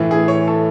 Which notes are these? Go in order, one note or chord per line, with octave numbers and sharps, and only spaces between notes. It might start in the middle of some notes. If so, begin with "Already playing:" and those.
Already playing: A2 E3
G#4
C#5
A4